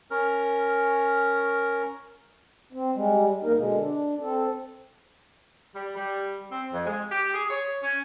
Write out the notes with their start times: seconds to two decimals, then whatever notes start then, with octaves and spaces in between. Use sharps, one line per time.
0.11 C#4 A#4 F6
2.73 C4
2.94 G3 G#3
3.43 E2 A#3 D#4 A#4
3.56 B2 D3 G#3
3.81 D4
4.21 C4 A4
5.75 G3
5.96 G3
6.51 C4
6.72 F2
6.86 G#3
7.11 G4
7.34 G#4
7.51 C#5
7.82 C#4